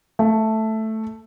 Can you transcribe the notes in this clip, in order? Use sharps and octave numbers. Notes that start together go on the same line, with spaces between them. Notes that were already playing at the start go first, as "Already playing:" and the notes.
A3